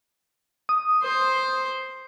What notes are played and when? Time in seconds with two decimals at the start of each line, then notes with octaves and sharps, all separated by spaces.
0.69 D#6
1.03 C5